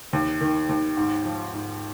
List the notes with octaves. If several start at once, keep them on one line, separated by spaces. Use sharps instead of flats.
D#2
D#3
D#2
G#2
F3
G#2